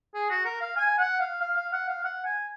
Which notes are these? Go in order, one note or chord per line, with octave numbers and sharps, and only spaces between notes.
G#4
F#4
A#4
F5
G#5
F#5
F5
F5
F5
F#5
F5
F#5
G#5